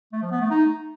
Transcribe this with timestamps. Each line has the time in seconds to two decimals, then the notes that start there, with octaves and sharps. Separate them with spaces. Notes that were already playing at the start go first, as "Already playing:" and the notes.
0.13 A3
0.22 F3
0.31 B3
0.41 A3
0.50 D#4